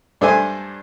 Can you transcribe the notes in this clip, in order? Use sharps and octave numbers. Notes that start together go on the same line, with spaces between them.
G2 D4 A4 C5 E5 G#5